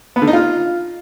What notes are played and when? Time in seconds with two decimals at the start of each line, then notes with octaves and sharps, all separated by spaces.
0.16 B3
0.22 D3
0.27 D#4
0.33 F4